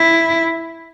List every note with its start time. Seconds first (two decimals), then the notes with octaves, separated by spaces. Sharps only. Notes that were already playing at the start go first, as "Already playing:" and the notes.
Already playing: E4